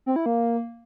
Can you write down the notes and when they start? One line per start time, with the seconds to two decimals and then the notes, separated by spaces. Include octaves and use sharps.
0.06 C4
0.16 E4
0.26 A#3